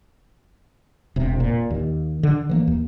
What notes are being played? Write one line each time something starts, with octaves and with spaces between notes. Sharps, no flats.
E1 C3
A#2
D#2
D3
E3 F#3 A#3
D#2